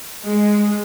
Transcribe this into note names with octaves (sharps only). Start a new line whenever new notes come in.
G#3